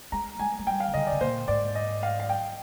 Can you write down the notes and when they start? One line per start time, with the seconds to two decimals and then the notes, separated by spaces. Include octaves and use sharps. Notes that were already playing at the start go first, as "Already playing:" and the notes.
0.12 G#3 A#5
0.39 G#3 G#5
0.59 G#3
0.67 G3 G5
0.80 F5
0.88 D#3
0.94 D3 D#5
1.07 D5
1.12 C3
1.20 A#2 C5
1.48 G#2 D5
1.75 D#5
2.03 F5
2.19 F5
2.29 G5